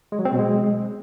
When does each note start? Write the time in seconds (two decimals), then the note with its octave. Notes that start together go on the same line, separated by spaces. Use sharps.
0.12 G#3
0.19 F#3
0.25 C4
0.32 B2
0.38 G#3